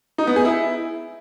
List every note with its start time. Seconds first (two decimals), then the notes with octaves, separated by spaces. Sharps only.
0.18 D#4
0.27 B3
0.36 G#4
0.45 E4